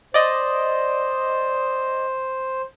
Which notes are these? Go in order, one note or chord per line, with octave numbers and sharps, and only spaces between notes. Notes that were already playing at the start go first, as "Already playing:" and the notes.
C5 D5 D#5